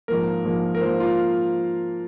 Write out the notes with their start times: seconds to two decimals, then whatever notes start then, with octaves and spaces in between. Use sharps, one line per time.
0.08 G#2 F3 A#3 A#4
0.45 G#2 F3 A#3
0.75 A#4
0.81 G#2 F3 A#3 C5
1.00 F4